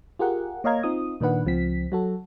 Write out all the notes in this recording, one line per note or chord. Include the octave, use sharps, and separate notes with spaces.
F4 G4 G#4 A#4 F#5
A#3 C#5 D#5 F5 A#5 G#6
C4 D#4 F4 D#6
A#2 D#3 D4 B4 F#5
C#2 F3 C4 B6
F#3 F#4 A4